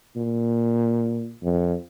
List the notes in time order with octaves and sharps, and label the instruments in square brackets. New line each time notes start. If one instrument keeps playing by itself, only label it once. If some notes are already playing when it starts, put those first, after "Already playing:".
[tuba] A#2
F2